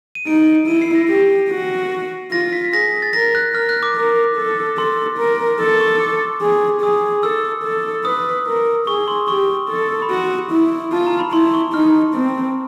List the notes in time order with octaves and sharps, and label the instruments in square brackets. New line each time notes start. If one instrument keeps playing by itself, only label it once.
[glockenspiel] D#7
[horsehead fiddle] D#4 [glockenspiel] D7
[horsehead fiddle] E4 [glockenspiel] D#7
[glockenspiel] C7
A#6
[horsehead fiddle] G4 [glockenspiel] A#6
[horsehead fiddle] F#4
[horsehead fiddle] F4 [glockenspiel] A#6
[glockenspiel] B6
B6
[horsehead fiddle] G#4 [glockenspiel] A#6
[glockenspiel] A6
[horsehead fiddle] A#4 [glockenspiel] A#6
[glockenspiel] F#6
[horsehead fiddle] A#4 [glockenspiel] F6
[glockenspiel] F#6
D6
[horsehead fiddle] A#4
A4
[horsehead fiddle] A4 [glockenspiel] C6
[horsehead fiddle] A#4
[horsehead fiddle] A4 [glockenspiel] C6
[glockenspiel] C#6
D6
[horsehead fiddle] G#4
[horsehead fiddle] G#4 [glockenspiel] D#6
[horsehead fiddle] A4 [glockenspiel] E6
[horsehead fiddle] A4
[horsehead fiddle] B4 [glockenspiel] D#6
[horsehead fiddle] A#4
[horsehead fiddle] G#4 [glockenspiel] C#6
[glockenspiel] C6
[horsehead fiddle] G4 [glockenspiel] C#6
[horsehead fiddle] A4
[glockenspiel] B5
[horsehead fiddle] F#4 [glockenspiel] C6
[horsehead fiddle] E4
[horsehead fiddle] F4 [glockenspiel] A5
[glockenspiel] A#5
B5
[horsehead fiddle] E4 [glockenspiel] C6
[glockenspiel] C#6
[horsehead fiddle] D#4 [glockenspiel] F6
[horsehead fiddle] C4